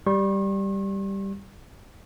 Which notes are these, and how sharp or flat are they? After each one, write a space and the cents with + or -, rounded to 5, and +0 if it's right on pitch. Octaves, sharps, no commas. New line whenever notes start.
G3 +0 C#6 -45